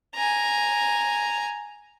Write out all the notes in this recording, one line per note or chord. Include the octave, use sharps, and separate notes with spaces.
G#5 A#5